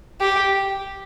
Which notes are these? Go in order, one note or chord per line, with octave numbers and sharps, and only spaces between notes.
G4